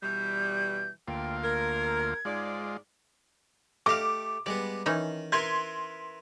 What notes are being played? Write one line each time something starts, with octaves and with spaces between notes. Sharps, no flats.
B2 E3 G3 G6
D2 A#3 F4 G5
A#4 G#6
G#2 G#3 F4 D5
A3 G4 D#5 F5 D6
G3 G#3 B3 D5
D#3 E3 C#4 D#4
E4 A#4 B4 C6 G#6